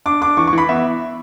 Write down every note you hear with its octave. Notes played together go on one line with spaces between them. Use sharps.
D4 D6
D4 D6
E3 C#6
C#6
E3 B5
B3 E5